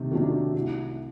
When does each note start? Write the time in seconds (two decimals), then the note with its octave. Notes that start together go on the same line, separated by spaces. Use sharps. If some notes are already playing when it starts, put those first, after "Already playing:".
Already playing: C3 D#3 A3
0.11 D#3 F#3 A3 D4
0.54 C2